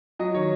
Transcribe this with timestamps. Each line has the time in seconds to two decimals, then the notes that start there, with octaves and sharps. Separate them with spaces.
0.19 F#3 D#5
0.34 D#3 C#5